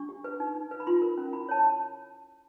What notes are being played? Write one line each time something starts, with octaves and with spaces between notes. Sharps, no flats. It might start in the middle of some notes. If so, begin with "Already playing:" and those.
Already playing: D4 C#6
G4
B4
D#4
D#4
B4
B5
F4 C6
A#4
C#4
E4 B5
C#5 A5